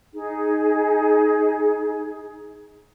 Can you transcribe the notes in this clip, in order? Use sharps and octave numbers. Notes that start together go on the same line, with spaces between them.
D#4 G#4